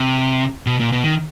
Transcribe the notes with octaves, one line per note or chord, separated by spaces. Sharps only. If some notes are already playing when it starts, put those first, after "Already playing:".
Already playing: C3
B2
A#2
B2
D#3